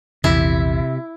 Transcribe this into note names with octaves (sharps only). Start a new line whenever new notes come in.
A#1 E2 C3 E3 E4